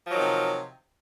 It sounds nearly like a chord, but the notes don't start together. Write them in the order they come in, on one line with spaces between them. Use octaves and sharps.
F3 F#3 D#3 C3